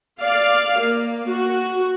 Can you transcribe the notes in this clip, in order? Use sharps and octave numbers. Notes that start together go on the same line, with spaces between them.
D5 F5
A#3
F#4